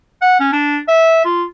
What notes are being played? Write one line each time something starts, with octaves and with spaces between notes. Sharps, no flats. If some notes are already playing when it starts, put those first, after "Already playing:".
F#5
C#4
D4
E5
F4